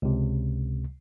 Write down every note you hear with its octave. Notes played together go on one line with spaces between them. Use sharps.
C#2 C3